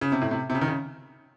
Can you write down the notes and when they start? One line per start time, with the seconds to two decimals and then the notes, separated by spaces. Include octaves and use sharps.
0.01 C#3
0.12 C3
0.21 A2
0.31 C3
0.50 C3
0.55 C#3
0.61 D#3
0.68 C#3